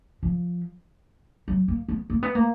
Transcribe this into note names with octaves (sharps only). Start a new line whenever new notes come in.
F3
F#3
A#3
B3
A#3
B3
A#3